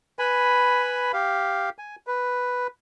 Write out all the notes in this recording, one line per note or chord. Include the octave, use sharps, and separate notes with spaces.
B4 G#5 B5
G4 F5
G#5
B4